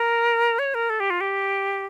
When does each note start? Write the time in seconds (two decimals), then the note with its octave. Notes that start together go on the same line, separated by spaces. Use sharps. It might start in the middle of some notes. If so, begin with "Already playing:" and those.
Already playing: A#4
0.59 C#5
0.74 A#4
0.90 A4
1.00 G4
1.10 F4
1.21 G4